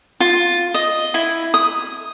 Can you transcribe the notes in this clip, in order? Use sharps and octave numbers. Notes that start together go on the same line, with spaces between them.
F4
D#5
E4
D#6